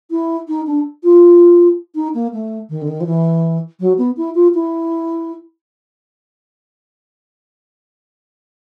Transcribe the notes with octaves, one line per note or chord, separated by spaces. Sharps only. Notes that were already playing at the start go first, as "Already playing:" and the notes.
E4
D#4
D4
F4
D#4
A#3
A3
D#3
D3
D#3
F3
E3
F#3
B3
E4
F4
E4